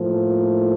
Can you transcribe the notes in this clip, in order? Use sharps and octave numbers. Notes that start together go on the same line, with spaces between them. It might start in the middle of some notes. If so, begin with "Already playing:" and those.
Already playing: A2 F3 A#3